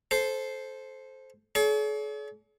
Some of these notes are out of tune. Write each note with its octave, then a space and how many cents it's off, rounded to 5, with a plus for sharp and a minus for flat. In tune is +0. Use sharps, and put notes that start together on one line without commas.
A4 -20 C5 +0
G#4 +45 C#5 +45